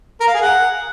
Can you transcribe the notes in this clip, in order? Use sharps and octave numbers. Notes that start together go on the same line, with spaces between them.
A#4
F5
G#4
F#5